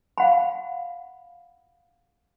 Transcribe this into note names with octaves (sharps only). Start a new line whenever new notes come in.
F5 F#5 B5